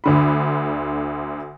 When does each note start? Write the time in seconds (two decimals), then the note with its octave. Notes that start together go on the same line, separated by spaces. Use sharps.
0.04 D2 D3 B5